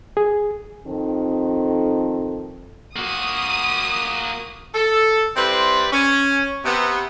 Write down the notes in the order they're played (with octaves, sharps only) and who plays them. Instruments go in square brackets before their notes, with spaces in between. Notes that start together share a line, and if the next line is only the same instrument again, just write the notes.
[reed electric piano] G#4
[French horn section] F2 D#3 C4 A4
[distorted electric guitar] A#3 F#4 [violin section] D#6
[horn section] A4
G3 C4 E4 B4 C5 D5
C#4
C3 B3